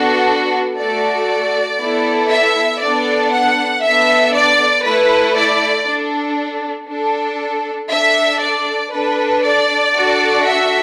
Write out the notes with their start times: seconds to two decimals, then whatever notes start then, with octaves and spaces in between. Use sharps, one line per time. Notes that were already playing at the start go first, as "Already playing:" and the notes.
Already playing: B3 D4 F#4 A4
0.77 A3 F#4 A4 D5
1.80 B3 E4 A4
2.30 E5
2.81 B3 D4 A4 D5
3.32 F#5
3.83 B3 D4 A4 E5
4.34 D5
4.84 A3 E4 A4 B4
5.35 D5
5.86 D4 A4
6.89 D4 A4
7.90 D4 A4 E5
8.41 D5
8.92 D4 A4 B4
9.43 D5
9.95 D4 F#4 A4
10.46 E5